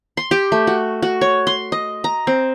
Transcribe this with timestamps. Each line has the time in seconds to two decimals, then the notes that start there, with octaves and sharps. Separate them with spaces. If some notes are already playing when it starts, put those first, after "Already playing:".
0.17 C6
0.31 G4
0.52 A3
0.67 F#4
1.02 F#4
1.21 C#5
1.47 C6
1.72 D#5
2.04 A#5
2.27 C4